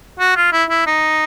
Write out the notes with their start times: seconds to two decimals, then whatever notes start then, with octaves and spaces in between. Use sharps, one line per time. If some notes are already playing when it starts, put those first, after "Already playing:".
0.20 F#4
0.36 F4
0.52 E4
0.70 E4
0.87 D#4